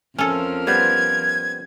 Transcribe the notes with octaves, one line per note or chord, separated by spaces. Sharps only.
F2 F3 C#4 A4 A#4
G3 B3 C4 G#6